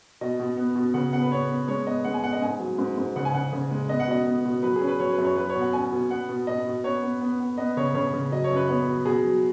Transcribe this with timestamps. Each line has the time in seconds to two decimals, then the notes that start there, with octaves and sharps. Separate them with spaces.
0.21 B2 D#5
0.40 B2
0.57 B3
0.76 B2
0.94 C#3 F#5
1.13 B3 F#5
1.23 B4
1.31 B3 C#5
1.50 B3
1.68 G#3 C#5
1.87 B3 D#5
2.04 G#3 F#5
2.14 G#5
2.23 B3 F#5
2.33 D#5
2.42 G#2 G#5
2.60 F#3
2.78 G#2
2.97 G#2
3.16 C#3 F#5
3.25 G#5
3.34 C#3 F#5
3.53 C#3
3.71 G#3
3.89 B3 D#5
4.00 F#5
4.08 B2 D#5
4.27 B3
4.45 B2
4.63 F#3 B4
4.76 G#4
4.81 C#4
4.88 B4
5.00 F#3 C#5
5.13 B4
5.19 F#2
5.25 C#5
5.37 F#3 B4
5.49 C#5
5.55 B2
5.61 F#5
5.73 C#4 G#5
5.92 B2
6.10 B3 F#5
6.29 B2
6.47 B2 D#5
6.66 B2
6.84 B3 C#5
7.03 B3
7.21 B3
7.40 B3
7.58 B3 D#5
7.77 C#3 C#5
7.94 C#3 C#5
8.13 C#3
8.32 F#3 D#5
8.44 C#5
8.51 F#2
8.56 B4
8.69 B3 C#5
8.87 F#3
9.06 B2 G#4
9.24 F#3